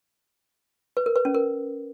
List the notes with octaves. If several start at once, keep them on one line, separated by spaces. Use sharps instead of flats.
B4
A#4
B4
C#4
A#4